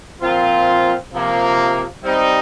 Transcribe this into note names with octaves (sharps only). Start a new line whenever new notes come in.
A#2 F3 C4 F4
C3 F3 A#3
G3 C4 D#4